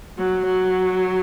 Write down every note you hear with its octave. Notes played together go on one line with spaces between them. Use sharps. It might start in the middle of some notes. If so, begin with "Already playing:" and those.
F#3
F#3